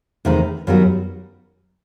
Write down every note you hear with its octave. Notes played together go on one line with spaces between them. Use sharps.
E2 C3 D#3 A3 D#4
F#2 D#3 G3 B3 F#4